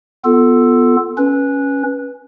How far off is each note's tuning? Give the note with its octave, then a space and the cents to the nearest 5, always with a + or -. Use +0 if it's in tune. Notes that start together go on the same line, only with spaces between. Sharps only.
B3 +5 F4 +0 A4 +0
C#4 +0 B4 -15